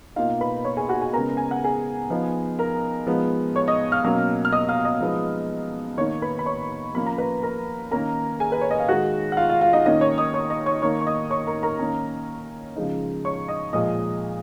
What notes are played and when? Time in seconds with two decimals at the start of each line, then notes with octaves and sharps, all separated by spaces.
0.16 B2 A#3 D#4 F4 F5
0.41 B4 B5
0.65 C#5 C#6
0.77 G#4 G#5
0.89 F#4 F#5
1.01 G#4 G#5
1.13 C#3 G#3 B3 A#4 A#5
1.37 G#5
1.51 F#5
1.64 G#4 G#5
2.10 F3 B3 D#4
2.59 A#4 A#5
3.07 F3 G#3 B3 D#4
3.56 C#5 C#6
3.68 D#5 D#6
3.92 F5 F6
4.04 B2 F#3 A#3 C#4
4.45 F6
4.53 D#5 D#6
4.69 F5 F6
4.84 D#5 D#6
5.01 F3 G#3 B3 D#4
5.98 D#3 A#3 D#4 C#5 C#6
6.22 B4 B5
6.39 B5
6.46 C#5 C#6
6.95 F3 A#3 C#4 B5
7.06 A#5
7.18 B4 B5
7.43 A#4 A#5
7.91 D#3 A#3 C#4 A#4 A#5
8.40 G#4 G#5
8.52 B4
8.61 C#5
8.71 D#5
8.80 F5
8.89 D#3 G#3 D#4 F#4 F#5
9.32 F#5
9.37 F4 F5
9.49 F4 F5
9.61 F4 F5
9.73 D#4 D#5
9.86 D#3 A#3 C#4 D#4 D#5
10.01 C#5 C#6
10.18 D#5 D#6
10.34 C#5 C#6
10.50 D#5 D#6
10.66 C#5 C#6
10.82 D#3 A#3 D#4 C#5 C#6
11.01 C#6
11.07 D#5 D#6
11.30 C#5 C#6
11.47 A#4 A#5
11.63 A#4 A#5
11.79 D#3 A#3 C#4
12.76 C#3 F3 G#3 D#4
13.25 C#5 C#6
13.48 D#5 D#6
13.73 A#2 F3 G#3 D#5 D#6